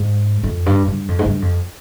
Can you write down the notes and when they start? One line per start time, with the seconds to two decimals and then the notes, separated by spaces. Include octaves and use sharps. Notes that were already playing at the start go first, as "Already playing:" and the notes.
Already playing: G#2
0.44 F2
0.66 G2
0.88 G2
1.08 F2
1.19 G#2
1.25 G2
1.42 F2